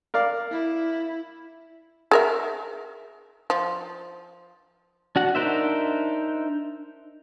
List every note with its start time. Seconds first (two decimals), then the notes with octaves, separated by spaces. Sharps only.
0.14 A#4 D5 F5
0.52 E4
2.11 G#4 A#4 E5
3.50 F3
5.16 D4 F#4 F#5
5.35 D4 D#4 A#4 C5 E5